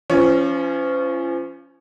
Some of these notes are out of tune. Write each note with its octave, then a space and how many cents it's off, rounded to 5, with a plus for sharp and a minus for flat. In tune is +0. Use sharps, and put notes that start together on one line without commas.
F3 -35 C#4 +0